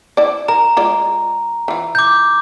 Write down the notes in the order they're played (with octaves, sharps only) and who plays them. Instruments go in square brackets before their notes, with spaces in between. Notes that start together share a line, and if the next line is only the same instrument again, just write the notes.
[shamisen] E4 D5
[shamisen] A#4 [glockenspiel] A#5
[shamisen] G#3 F4 D5
E3 F4
[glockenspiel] D6 G6